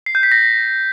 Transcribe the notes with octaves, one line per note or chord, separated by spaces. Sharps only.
C7
G6
B6
A#6